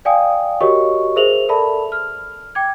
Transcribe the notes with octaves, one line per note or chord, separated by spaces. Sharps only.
D5 F5 G5 G#5 D#6
F#4 G4 A#4 C#5 D#5 C#6
G#4 A#4 C5 E5 F7 F#7
A4 A#4 D5 E5 A5 B5
F6
G5 D6 G#6